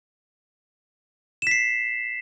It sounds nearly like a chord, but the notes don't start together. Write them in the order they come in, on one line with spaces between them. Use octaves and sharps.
E7 B6 C7